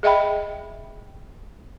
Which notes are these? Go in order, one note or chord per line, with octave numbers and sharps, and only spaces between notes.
G#4 D#5 E5 G5 B5